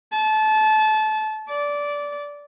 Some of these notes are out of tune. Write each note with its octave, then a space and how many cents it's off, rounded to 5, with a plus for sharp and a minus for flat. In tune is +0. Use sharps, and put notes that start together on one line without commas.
A5 -25
D5 -15